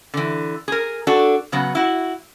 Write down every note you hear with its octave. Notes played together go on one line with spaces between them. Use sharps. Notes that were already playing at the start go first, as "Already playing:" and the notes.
D3 E3
G#4 A#4
D4 F#4 A4
C#3 F#3 B3
E4 F#4